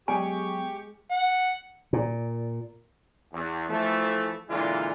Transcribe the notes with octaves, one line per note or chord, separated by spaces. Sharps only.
F#3 G#3 B3 G4 G#4 G#5 C#6
F#5
A#2
E2
E3 F3 A3
A#2 D3 E3 G#3 F4